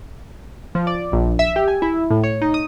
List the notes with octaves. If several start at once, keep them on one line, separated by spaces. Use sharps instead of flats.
F3
D5
A#1
E5
G4
G#5
E4
A2
C#5
D#4
D#6